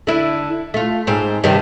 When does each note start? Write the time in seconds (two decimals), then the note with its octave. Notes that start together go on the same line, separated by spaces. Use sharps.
0.07 D3 E4
0.74 A3 F4
1.07 G#2 C4
1.44 G2 C3 D#3